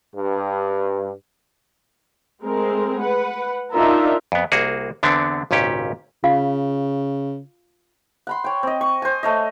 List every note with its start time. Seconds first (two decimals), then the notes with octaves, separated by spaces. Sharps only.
0.14 G2
2.43 G#3 A3 C4 A#4
3.01 B4 F#5
3.73 D4 D#4 F4 A#4 E5
4.32 F2 B3
4.52 C2 A#3 F#4 G#4
5.03 E2 D3 B3 C4 D4
5.51 G#1 C#2 A#2 C#4 G4
6.24 C#3 F4 F5
8.27 F#5 B5 C6
8.44 C#5 G5
8.63 C4 D#5
8.81 C#6
9.02 C5 G#5
9.23 A3 C#5 D#5